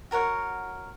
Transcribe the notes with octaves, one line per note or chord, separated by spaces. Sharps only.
F#4 A#4 C#5 F#5